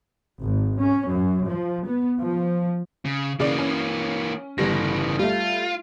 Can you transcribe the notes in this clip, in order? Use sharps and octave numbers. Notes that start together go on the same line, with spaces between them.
G#1
C#4
F#2
F3
B3
F3
C#3
C#3 E3 A#3 D5
C#4
G1 C#3 E3 G3 A#6
G3 A3 F4